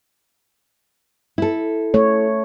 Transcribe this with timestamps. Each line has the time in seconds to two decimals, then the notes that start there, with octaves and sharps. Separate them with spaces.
1.38 E4 A4
1.94 A3 C#5